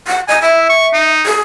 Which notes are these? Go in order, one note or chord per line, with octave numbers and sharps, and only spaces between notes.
F#5
D#5 G#5
E4 E5
C#6
D#4
G#4